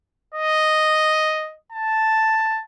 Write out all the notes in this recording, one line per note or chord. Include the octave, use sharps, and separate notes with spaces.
D#5
A5